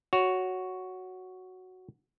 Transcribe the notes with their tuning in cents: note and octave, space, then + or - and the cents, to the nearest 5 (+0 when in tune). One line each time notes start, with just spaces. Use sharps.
F#4 +0 C#5 +5